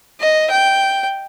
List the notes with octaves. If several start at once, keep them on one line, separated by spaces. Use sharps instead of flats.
D#5
G5